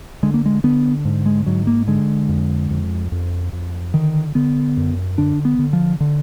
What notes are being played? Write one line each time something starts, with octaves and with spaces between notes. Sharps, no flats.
D3 G#3
A#3
G#3
D3 B3
G#2
G#3
G#2 F#3
A#3
D3 G#3
F2
F2
F2
F2
D3 D#3
D3 B3
F#2
D3 D4
B3
D3
F3
D3